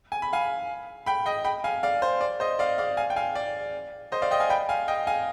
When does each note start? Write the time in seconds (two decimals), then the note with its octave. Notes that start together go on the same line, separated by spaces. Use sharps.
0.12 G#5
0.22 B5
0.33 F5 G#5
1.06 G5 B5
1.26 D#5 G5
1.44 G5 B5
1.64 F5 G#5
1.83 D5 F5
2.02 C5
2.21 D5
2.40 C5 D#5
2.59 D5 F5
2.78 D5 F5
2.97 F5 G#5
3.10 G5
3.16 F5 G#5
3.35 D5
4.12 C5 D#5
4.22 D5 F5
4.31 D#5 G5
4.40 F5 G#5
4.50 G5 B5
4.69 F5 G#5
4.88 D#5 G5
5.07 F5 G#5